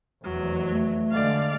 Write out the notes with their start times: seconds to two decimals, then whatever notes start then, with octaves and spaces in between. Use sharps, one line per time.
0.24 F1 E2 F#3
0.71 A3
1.11 D3 G#3 D5 F5